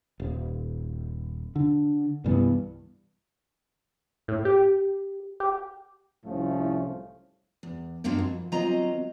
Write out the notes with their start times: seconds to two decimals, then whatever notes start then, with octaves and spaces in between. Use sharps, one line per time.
0.20 D#1
1.56 D3
2.24 C2 G2 E3 B3
4.28 A2
4.45 G4
5.40 G4
6.24 C2 A2 F3 A3 C#4
7.63 E2
8.04 F#2 F#3 A#3 C4 D4 D#4
8.19 F2
8.52 D2 F#3 C4 F4 D#5 A#5